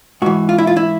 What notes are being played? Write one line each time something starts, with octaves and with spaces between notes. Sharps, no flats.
G#2 E3 F#4
F4
E4
F4
E4